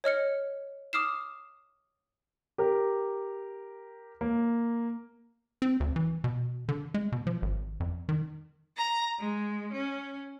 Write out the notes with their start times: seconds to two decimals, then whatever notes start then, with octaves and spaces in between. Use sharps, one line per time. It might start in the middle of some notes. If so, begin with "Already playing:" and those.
0.04 C#5 D#5 F6 C#7
0.93 D6 D#6 F6 C7 E7
2.58 G4 A#4
4.21 A#3
5.62 C4
5.80 D2
5.96 E3
6.24 B2
6.69 D3
6.94 G#3
7.12 B2
7.27 F3
7.42 G#1
7.80 F2
8.09 D#3
8.77 A#5
9.19 G#3
9.73 C#4